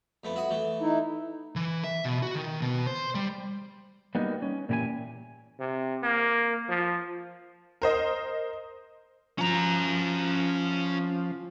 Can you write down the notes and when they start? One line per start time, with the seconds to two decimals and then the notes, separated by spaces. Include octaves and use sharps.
0.24 F2 A3 B3
0.36 E4 F#4 D#6
0.50 E3 A3
0.81 D#4 E4
1.56 E3
1.84 E5
2.05 B2
2.23 F#4
2.36 D#3
2.62 B2
2.87 C5
3.15 G3
4.15 G3 A#3 B3 D#4 F#4
4.42 C#4
4.69 A#2 E3 G4 B4 G#5
5.59 C3
6.03 A#3
6.69 F3
7.82 A#4 C5 D#5
9.39 F3 C#4 A#5